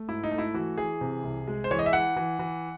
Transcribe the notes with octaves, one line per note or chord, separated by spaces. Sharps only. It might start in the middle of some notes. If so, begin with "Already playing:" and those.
Already playing: A3
G#2 E4
D#4
A3
E4
E3 F#4
E3 G#4
C3
C2
G#3
C5
E3 C#5
D#5
E5
E3 F#5
E3
E3